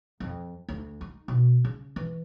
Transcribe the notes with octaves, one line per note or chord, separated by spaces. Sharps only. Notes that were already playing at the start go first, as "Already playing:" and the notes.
F2
D2
D#4
B2
C#3
E3